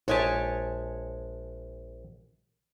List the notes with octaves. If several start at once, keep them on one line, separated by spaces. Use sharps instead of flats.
A#1 G#3 G4 C#5 G#5 A5